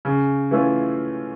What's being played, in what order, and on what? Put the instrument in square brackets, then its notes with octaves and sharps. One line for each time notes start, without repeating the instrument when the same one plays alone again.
[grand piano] C#3
E3 A3 C#4 F4